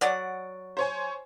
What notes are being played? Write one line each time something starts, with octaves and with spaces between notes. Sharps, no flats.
F#3 D5 F#5
C5 C#5 G#5